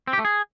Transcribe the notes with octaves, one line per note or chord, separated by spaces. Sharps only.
C4
G4
A3
G#4